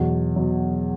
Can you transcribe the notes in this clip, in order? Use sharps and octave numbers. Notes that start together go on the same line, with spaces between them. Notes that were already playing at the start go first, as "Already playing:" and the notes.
Already playing: E2 B2 F#3
B2 F#3